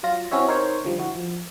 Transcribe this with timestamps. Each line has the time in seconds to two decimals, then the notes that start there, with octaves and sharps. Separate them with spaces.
0.03 F#3 F4 A#6
0.31 C4 C#4 E4 F#4 C#5 E5
0.48 D#4 A#4 C5 C#5
0.85 D3 F3 G3
0.98 E4 F#4
1.15 F3